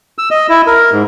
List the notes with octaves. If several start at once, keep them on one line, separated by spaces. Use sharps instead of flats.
E6
D#5
E4
A#4
G#2